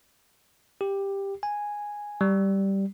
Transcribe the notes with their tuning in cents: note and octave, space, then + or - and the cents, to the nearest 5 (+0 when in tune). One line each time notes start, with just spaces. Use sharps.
G4 +10
G#5 -5
G3 -5